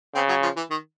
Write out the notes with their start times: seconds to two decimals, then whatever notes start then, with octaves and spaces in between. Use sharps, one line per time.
0.15 C#3 C4
0.28 F#3
0.43 F3
0.57 E3
0.70 D#3